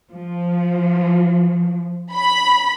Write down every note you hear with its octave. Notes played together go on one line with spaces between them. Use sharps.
F3
B5